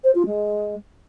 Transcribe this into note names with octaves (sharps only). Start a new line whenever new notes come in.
C5
F4
G#3